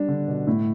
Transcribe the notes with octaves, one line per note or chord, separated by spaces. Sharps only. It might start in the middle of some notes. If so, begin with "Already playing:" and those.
Already playing: G3 D4
D3
B2
A2